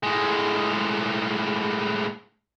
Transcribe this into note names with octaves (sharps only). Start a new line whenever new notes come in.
A2 G#3